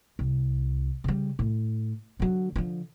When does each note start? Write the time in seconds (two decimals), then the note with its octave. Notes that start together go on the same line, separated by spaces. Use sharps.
0.19 C2
1.04 C#3 G3
1.39 A2
2.20 D3 F#3
2.56 D3 F3